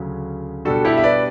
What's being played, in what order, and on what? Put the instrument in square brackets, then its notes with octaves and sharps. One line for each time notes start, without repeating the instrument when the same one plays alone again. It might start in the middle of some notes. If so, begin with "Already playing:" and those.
Already playing: [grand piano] D2 C#3 F#3 C#4
B2 G3 D4 F#4 A4
E4 G4
E5
B4 D5